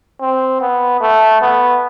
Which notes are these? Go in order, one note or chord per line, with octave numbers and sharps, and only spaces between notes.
C4
B3
A3
B3